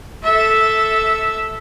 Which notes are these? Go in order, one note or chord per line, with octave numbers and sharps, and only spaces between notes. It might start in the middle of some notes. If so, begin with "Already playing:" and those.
A4 E5